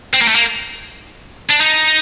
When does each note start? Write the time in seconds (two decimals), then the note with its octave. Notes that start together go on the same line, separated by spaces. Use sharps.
0.14 C4
0.21 A#3
0.28 A3
0.35 A#3
1.50 D4
1.61 D#4